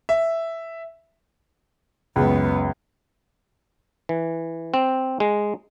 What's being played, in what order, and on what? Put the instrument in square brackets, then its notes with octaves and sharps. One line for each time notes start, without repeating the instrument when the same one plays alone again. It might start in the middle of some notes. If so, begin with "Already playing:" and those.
[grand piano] E5
[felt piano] C#2 [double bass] F#2 B3
[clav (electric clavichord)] E3
C4
G#3